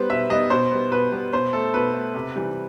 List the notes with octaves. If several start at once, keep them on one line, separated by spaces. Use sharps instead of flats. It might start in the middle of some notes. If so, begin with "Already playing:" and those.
Already playing: G3 B3 B4 C5
B2 E5
G3 B3 D#5
B2 C5
G3 B3
B2 B4
G3 B3
B2 C5
A3 A4
B2 B4
A3
C3
E3 G3